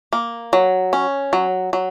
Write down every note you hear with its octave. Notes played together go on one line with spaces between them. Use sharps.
A#3
F#3
C#4
F#3
F#3